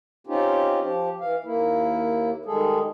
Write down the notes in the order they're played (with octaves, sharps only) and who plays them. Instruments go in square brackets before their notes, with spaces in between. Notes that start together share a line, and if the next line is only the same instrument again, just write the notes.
[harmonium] C4 C#4 D#4 F4 G4
F3 G4
E3 F5
D#2 A#3 E4
D#3 G3 G#3 G#4 A4